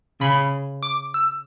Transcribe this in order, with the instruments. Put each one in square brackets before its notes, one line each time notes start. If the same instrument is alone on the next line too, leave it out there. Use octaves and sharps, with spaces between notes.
[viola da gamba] C#3 [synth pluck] B5
[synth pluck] D6
E6